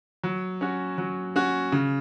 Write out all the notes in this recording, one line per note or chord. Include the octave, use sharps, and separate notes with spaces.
F#3
C#4 F#4
F#3
C#4 F#4
C#3